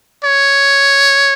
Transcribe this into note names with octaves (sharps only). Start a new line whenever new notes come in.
C#5